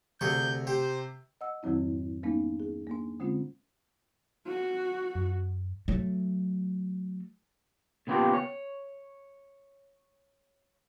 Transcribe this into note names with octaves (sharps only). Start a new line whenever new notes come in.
D2 C3 G#4 C#6 G6
G4 C5
D#5 F#5 E6
F2 G#2 D#3 F#3 C4 E4
G3 A#3 B3 C#4 D#4
G#4
A#3 D4
D3 G#3 C4 C#4 F4
F#4
F#2
F#3 A3
A#2 C#3 B3 F4 G4
C#5